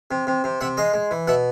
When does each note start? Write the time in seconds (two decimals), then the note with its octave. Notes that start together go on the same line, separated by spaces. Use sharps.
0.11 C3
0.27 C3
0.44 C3
0.61 C3 E5 F#5
0.77 G#3 D#5 F5
0.94 G#3
1.11 E3
1.27 B2 E5 F#5